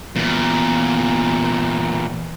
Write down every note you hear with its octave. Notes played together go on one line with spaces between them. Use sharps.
E2 A#2